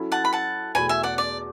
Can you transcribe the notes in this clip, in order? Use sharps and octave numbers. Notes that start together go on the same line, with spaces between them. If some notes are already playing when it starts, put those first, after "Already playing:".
Already playing: F#3 C#4 E4 A4
F#5 A5
B5
F#5 A5
E2 B2 A3 G#5 B5
E5 G#5
D5 F#5
D5